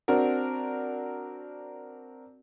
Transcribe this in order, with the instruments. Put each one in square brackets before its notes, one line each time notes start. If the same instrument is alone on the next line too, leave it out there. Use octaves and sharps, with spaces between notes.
[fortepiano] C4 D4 F#4 A#4